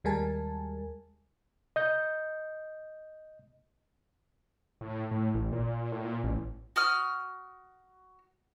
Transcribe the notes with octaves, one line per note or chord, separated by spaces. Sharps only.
D#2 G3 G#3 A#4 G#5 A5
D#5 G6
A2
A2
A1
A#2
A2
A#2
A1
F#4 D#6 F6